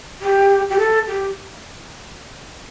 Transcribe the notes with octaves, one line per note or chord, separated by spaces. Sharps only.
G4
G4
A4
G4